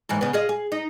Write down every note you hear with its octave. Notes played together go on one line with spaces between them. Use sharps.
D#2 G#2 E3
C#3 B3
F4 G#4 D#5
G#4
D#4